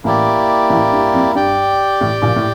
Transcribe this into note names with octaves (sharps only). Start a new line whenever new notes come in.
A1 A2 A#3 E4 G4 D5
A1 A2
G2
F2
G2 G4 D5 G5
A1 A2
A#1 A#2
A2